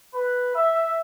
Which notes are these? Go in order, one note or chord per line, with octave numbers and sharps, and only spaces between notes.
B4
E5